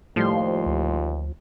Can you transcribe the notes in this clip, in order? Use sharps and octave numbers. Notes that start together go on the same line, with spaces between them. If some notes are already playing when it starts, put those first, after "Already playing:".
D#2 A2 F3 G3 C6
D2